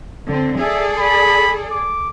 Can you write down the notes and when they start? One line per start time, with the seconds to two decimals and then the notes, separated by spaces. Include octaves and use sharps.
0.28 D3 C4
0.60 G#4 A4 D5 E5
0.99 B5
1.71 D6